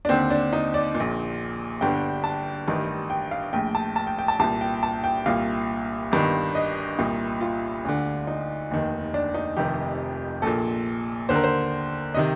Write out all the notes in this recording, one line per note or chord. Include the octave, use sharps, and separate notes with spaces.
D4
D#2 D3 C4
D4
D#4
D5
A#2
A#1
G1 G2 D3 G5
A5
A1 G2 D#3
G5
F5
A#1 A2 G5
A5
A5
G5
G5
A5
C2 A#2 A5
G5
A5
G5
C2 A#2 F5
G1 G2 D#3
D#5
C2 A#2
F4
D2 D3
D#4
F1 D#2 D#3
D4
D#4
F1 F2 C3 D#3 G4
A#1 A#2 A4
D#2 D3 C5
A#4
C5
C3 D#3 D#5